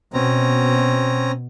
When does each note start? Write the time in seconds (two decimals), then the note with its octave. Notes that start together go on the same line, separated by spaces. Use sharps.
0.14 B2 C4 C#4 A#5